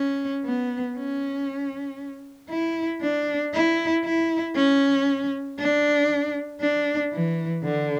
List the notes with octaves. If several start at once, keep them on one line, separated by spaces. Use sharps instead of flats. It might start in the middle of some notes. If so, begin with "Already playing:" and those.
Already playing: C#4
B3
C#4
E4
D4
E4
E4
C#4
D4
D4
E3
D3